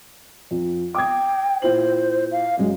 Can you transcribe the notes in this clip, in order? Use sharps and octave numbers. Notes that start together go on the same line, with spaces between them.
F2
G5 D6 D#6 G#6
A#2 E4 C5 F#7
F5
F#2 F#3 G#3